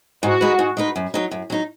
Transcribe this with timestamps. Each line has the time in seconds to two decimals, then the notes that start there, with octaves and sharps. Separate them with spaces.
0.23 G#2 F#4
0.41 G#3 D#4 B4
0.59 G#2
0.77 G#3 D#4 B4
0.96 F#2
1.14 F#3 D#4
1.31 F#2
1.50 F#3 D#4